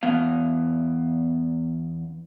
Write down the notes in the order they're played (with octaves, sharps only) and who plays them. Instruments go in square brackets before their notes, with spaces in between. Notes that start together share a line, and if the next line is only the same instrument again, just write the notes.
[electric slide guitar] E2 B3 F5